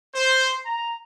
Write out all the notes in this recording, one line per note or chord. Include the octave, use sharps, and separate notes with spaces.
C5
A#5